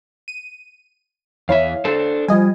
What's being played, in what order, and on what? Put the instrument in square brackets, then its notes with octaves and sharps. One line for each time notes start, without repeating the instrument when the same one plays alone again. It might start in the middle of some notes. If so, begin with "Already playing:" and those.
[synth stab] D#7
[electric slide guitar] E2 E5 [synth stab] E4 C#5 F5
[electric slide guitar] D4 A4 C5
[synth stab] F3 D#5 G#5 [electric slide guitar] G3